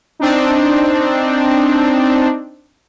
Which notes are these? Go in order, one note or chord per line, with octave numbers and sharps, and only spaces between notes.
C4 D4 D#4